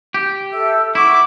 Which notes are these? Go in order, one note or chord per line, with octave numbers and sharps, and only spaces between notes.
G4
A4 E5 E6
E4 F#5 C#6 D6